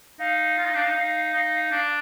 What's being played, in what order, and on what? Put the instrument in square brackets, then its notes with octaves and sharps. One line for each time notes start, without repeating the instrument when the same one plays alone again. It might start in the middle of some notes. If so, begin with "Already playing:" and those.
[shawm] D#4 [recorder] F5
[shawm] F4
D#4
D4
D#4
D#4
D#4
D4